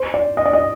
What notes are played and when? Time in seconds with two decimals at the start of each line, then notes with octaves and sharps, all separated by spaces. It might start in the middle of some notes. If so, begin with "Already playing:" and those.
Already playing: C5
0.14 D5
0.37 D#5
0.45 D5
0.53 D#5